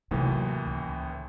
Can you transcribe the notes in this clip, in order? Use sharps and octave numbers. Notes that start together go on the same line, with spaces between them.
D#2 A2 C3 E3 F#3
C#2